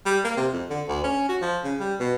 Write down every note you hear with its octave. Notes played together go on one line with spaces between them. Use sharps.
G3
A#3
C3
F2
D3
D2
C#4
F#4
F3
C#3
G3
B2